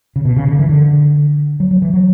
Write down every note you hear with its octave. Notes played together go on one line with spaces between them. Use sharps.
C#3
B2
C#3
D3
E3
D3
F#3
F#3
E3
F#3